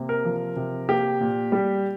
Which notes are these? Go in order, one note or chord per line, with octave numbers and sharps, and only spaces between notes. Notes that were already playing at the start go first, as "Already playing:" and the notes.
Already playing: C3 A#3
A#4
F3
C3
A#3 G4
A#2
G3